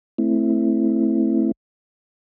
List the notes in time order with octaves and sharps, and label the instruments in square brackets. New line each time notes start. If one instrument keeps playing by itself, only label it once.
[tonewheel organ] A3 C4 E4